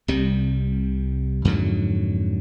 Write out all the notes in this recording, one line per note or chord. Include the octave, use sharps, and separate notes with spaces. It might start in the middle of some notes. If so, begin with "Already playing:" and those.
C2 C3 G3
F2 G#2 D3 F#3